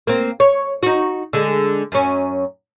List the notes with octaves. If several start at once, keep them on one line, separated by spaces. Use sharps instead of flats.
A#3 C4
C#5
D#4 F#4
D3 G#3
F#2 C#4